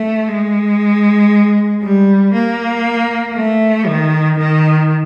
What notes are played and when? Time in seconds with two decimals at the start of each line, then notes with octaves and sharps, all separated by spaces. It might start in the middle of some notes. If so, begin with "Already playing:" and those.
Already playing: A3
0.28 G#3
1.82 G3
2.34 A#3
3.35 A3
3.86 D#3
4.38 D#3